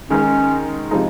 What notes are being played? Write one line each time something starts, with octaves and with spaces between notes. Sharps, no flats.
D#3 G#3 C#4 D#4 A#4
C3 F3 G#3 D#4